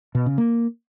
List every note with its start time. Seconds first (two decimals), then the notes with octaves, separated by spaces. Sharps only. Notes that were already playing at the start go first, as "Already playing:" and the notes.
0.15 B2
0.26 C#3
0.38 A#3